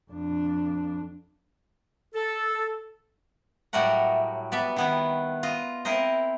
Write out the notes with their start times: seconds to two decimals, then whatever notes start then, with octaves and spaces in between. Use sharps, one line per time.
0.11 F2 D4
2.14 A4
3.73 A2 F#3 G3 A3 A#4 F#5
4.52 B3 D5 E5 A5
4.76 D#3 B3 E4
5.43 F4 D#5
5.85 C4 E4 A#4 C5 D#5